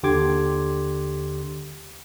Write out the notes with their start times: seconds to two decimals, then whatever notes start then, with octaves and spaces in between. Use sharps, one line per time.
0.03 D#2 D3 G4 C6 D6 G#6